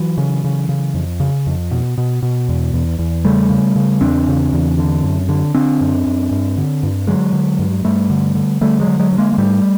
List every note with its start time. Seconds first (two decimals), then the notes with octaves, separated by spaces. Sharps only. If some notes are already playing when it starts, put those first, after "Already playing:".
Already playing: E3 F#3
0.18 C#3
0.44 C#3
0.69 C#3
0.94 F2
1.20 C#3
1.47 F2
1.71 B2
1.98 B2
2.23 B2
2.49 E2
2.73 E2
2.99 E2
3.25 C#3 G3 A3
3.50 C#3
3.76 C#3
4.01 E2 C4 D4
4.28 C#3
4.53 E2
4.79 D3
5.04 F#2
5.29 D3
5.55 D3 C4 D4
5.81 F#2
6.06 F#2
6.31 G2
6.57 D3
6.83 G2
7.07 D3 F#3 G#3
7.33 D3
7.59 G2
7.84 G2 G3 A3
8.10 D3
8.35 D3
8.61 D3 G3 A3
8.80 F#3 G#3
8.87 D3
8.99 F#3 G#3
9.12 G2
9.18 G#3 A#3
9.33 G#3
9.38 G#2 G3 A3